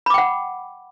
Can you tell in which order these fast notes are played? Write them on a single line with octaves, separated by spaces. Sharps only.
B5 D6 G5 F#5